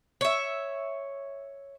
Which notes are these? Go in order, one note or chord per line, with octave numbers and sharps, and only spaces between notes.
C#5 E5